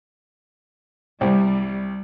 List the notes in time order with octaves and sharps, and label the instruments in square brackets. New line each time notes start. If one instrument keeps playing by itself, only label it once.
[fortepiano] C2 [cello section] G3